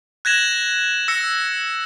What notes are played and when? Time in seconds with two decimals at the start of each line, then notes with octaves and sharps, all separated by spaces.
0.25 F#6 G#6 A#6 E7 F#7
1.08 E6 A#6 C#7